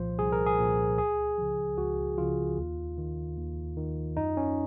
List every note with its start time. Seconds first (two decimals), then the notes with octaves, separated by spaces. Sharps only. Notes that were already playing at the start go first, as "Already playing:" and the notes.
Already playing: C2 A#2 F3 C5
0.19 C2 G#4
0.32 A#4
0.46 G#4
0.59 A#2 F3
0.98 C#2 G#4
1.38 C#3 F3
1.78 C#2 F#4
2.18 C#3 F3 F4
2.58 D#2
2.98 D#3
3.37 D#2
3.77 D#3
4.17 F#2 D#4
4.37 C#4